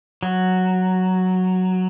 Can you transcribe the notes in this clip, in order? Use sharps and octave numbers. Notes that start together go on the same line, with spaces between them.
F#3